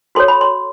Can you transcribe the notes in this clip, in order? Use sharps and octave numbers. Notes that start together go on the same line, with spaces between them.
F#4 A4 C#5 C6
B5
C6